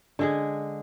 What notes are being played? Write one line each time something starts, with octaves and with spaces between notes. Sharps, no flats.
D3 G#3 G#4